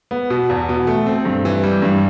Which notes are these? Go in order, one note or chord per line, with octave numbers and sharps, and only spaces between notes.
B3
B2
E2
B2
A3
C4
G2
E3
G3
G2